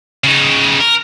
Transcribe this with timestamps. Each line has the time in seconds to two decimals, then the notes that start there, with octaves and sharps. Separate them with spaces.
0.24 C#3 D#4
0.80 A#4